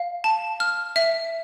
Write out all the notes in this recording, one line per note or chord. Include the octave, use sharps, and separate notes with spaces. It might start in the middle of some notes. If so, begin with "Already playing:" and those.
Already playing: F5
A5
F6
E5